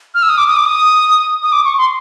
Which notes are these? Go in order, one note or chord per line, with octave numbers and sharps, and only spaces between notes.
F6
E6
D#6
D6
D#6
D6
D#6
D#6
D6
C#6
C6